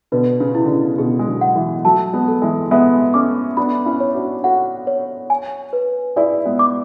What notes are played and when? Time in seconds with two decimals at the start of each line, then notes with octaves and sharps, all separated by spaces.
0.12 B2 D3 B4
0.40 C#3
0.55 E4
0.65 D3
0.70 C#3
0.98 B2 D3 G#4
1.19 G#3
1.27 D3 F#3
1.41 F#5
1.55 E3 G#3
1.85 F#3 A3 A5
2.13 G#3 B3
2.28 A4
2.42 E3 G#3
2.71 G#3 B3 E5
3.14 A3 C#4 D6
3.57 B3 D4 B5
3.86 C#4 E4
4.00 C#5
4.14 D4 F#4
4.44 F#4 A4 F#5
4.87 C#5
5.30 G#5
5.73 B4
6.16 E4 G#4 D5
6.45 G#3 B3
6.59 D6